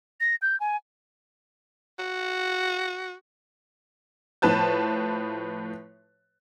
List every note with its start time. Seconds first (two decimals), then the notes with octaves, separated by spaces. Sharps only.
0.21 A#6
0.42 G6
0.60 G#5
1.99 F#4
4.42 A2 F3 B4 A5 G6